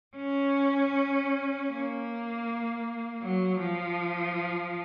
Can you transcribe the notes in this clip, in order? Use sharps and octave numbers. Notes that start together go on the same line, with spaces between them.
C#4
A#3
F#3
F3